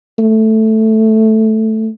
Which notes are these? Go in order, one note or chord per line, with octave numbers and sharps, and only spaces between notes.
A3